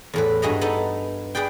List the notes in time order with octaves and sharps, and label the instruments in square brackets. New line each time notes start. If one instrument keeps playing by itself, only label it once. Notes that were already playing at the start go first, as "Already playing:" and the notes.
[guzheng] E2 A2 B4
G2 F#4 G#4 D#5 E5 A#5
B3 D#4 A4 E5
G#4 B4 D5 G5